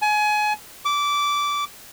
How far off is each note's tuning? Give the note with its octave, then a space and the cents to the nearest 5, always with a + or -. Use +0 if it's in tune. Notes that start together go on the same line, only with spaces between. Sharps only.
G#5 +25
D6 -15